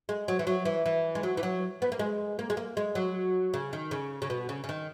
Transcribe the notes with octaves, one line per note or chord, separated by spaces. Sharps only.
G#3
F#3
E3
F#3
E3
E3
G#3
F#3
E3
F#3
B3
A#3
G#3
A#3
G#3
A#3
G#3
F#3
C#3
D#3
C#3
C#3
B2
C#3
C#3
D#3